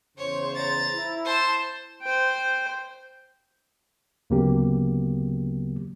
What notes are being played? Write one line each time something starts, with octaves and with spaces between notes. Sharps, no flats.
E2 C#3 C5 C#5
A#5 A6
E4
C5 A5
C5 G5
D2 C#3 F#3 A#3 B3 G4